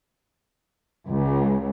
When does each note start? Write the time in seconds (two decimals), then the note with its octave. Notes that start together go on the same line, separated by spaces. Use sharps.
1.08 C#2